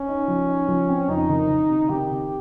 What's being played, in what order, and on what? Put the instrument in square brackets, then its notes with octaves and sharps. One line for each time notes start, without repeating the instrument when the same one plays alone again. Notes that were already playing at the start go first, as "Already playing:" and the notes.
Already playing: [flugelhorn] C#4
[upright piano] D#4
F3
D#4
F3
C4
[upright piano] F2 [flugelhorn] D#4
[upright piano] D#3
D#3
C3
[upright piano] D#3 [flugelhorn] G4
[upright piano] C3